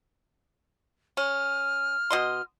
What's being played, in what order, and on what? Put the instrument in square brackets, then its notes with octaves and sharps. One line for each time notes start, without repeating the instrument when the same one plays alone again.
[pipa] C#4 [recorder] F6
[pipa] B2 D#5 C6